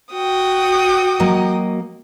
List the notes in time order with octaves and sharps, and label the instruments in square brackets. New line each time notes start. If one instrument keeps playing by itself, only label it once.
[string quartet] F#4 G5 D#6
[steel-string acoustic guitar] F#3 A#3 D#5